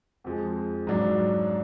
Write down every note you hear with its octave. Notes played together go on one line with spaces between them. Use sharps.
F2 F3 G#3
G#2 F#3 D4